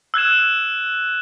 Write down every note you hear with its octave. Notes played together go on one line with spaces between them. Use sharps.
E6 F#6 G#6 E7